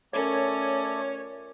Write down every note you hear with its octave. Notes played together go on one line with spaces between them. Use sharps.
A3 C#4 F4 A4 A#4 C#5 D5